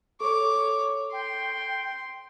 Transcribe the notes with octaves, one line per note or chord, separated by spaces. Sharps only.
A4 C#5 C#6 D6
G5 C6